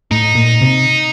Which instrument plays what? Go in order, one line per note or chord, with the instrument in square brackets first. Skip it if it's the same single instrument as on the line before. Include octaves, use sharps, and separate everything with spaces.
[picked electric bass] A2 [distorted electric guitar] D#4
[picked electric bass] A#2
C3